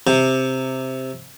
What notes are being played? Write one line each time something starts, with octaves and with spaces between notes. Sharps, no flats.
C3